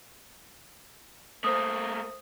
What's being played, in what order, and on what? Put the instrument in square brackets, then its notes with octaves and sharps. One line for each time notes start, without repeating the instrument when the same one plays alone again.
[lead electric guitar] A3 A#3 [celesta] C5 D#6